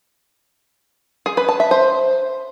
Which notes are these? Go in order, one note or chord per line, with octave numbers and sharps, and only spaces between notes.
G#4
B4
A5
E5
C5